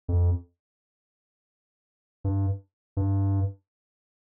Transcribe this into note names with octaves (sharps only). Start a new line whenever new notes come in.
F2
G2
G2